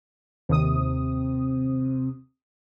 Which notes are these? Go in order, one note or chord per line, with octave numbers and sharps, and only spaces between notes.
D#2 C3 D#6